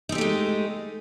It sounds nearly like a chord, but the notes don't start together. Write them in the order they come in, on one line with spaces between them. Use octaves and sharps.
D#4 C4 G4 A3 G#3